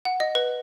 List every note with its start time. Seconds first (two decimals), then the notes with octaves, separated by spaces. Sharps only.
0.05 F#5
0.20 D#5
0.35 B4